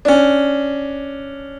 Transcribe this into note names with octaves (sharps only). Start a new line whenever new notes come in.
C#4 D4